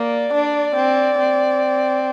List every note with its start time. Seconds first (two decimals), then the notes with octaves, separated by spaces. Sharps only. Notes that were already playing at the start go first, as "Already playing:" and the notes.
Already playing: A#3 D5
0.34 D4
0.76 C4
1.19 C4